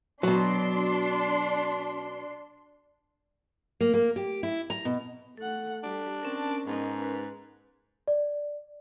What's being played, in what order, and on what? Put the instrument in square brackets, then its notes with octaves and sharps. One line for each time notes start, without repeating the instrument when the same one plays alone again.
[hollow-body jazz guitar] B2 F#3 [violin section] D4 C6
[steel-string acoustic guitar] A#3
A#3
G4
E4
A#5
B2
[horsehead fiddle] A3 F#5 [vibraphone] A4
[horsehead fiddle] G3 G4 [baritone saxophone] D4
[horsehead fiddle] C4 A5 [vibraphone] C#4 A#4
[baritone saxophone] G#2 [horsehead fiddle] B3 D#5
[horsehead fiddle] B4
[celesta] D5